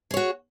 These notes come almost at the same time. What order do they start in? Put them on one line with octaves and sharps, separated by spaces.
G#4 C#5 F#4